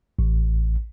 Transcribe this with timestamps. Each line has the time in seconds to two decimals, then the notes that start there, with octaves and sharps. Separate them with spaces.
0.19 A1